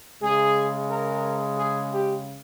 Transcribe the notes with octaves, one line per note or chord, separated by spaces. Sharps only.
C#3 G#3 G#4
A#4
G#4
G4